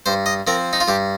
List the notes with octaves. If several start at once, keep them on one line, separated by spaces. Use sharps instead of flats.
G2 C5
D#5
F3 C4 A#4
D#4
F4
G2 G4